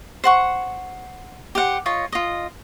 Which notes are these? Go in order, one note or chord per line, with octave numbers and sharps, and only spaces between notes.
C5 F#5 C#6
G4 C5 F#5
F4 C#5 D#5
F4 D#5